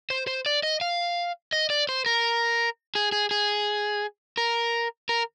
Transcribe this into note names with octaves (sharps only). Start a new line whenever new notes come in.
C5
C5
D5
D#5
F5
D#5
D5
C5
A#4
G#4
G#4
G#4
A#4
A#4